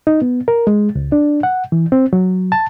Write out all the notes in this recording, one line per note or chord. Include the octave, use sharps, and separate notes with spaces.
D#4
B3
A#4
G#3
C#2
D4
F#5
E3
C4
F#3
A5